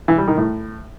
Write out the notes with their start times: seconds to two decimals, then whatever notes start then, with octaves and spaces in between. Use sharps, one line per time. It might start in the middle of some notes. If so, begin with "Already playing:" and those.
0.08 E3
0.18 G3
0.27 D#3
0.37 A2